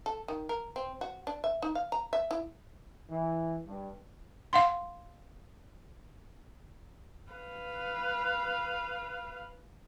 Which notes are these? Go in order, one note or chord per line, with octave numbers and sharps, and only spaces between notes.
A4
D#3
A#4
C4
F#4
D4
E5
D#4
F5
A#5
E5
E4
E3
G2
F5 F#5 C6
B4 F5